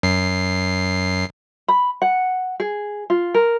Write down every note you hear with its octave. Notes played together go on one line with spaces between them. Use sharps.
F#2 C7
B5
F#5
G#4
F4
A#4